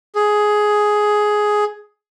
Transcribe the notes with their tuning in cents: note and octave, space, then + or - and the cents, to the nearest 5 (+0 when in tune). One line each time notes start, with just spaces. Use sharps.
G#4 +10